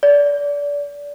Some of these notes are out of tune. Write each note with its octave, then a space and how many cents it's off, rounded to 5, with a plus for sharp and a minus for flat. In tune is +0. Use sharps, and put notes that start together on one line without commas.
D5 -25